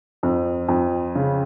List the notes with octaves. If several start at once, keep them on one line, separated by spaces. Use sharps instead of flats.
F2
F2
C#3